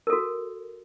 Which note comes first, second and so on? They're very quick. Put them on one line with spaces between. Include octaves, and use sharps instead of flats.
A#4 A4 F#4